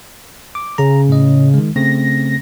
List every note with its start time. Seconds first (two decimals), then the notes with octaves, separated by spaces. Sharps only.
0.55 D6
0.78 C#3 A#5
1.09 A2 D#5
1.54 D#3 G#3
1.76 C#3 A3 C4 A#6